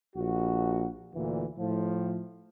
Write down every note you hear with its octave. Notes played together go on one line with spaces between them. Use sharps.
A#1 F#4
D2 A#2 D3 E3
A2 F3